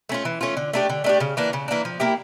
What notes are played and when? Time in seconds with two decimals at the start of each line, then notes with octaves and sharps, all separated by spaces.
0.09 A3 C#4 F4
0.25 E3
0.41 A3 C#4 F4
0.57 D3
0.73 A3 D4 G4
0.89 D3
1.04 A3 D4 G4
1.20 C#3
1.37 E3 A#3 D4
1.53 C#3
1.68 E3 A#3 D4
1.85 F3
2.00 A#3 E4 G4